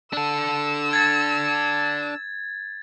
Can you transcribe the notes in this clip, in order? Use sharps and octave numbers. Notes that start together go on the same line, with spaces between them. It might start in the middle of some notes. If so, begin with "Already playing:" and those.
D4 A4 E6
G#6 A6